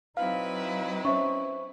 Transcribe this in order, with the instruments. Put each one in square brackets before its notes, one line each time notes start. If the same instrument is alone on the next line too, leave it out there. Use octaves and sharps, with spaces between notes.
[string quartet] F#3 E4 B4 [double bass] C4 D#4 [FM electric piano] F5
[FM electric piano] C#4 [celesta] C5 E5 C#6